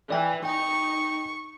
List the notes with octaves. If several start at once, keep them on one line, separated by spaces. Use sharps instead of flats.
E3 D5 G5
D#4 G5 C#6